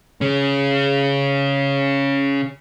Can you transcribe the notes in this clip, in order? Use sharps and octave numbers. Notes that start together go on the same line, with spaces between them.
C#3 C#4